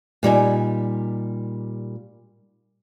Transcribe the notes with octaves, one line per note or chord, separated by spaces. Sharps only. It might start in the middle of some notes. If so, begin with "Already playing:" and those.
A#2 G3 D#4 G#5